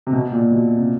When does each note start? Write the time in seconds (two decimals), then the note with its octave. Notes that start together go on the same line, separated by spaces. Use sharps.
0.07 C3
0.13 B2
0.32 A#2
0.51 B2
0.76 C3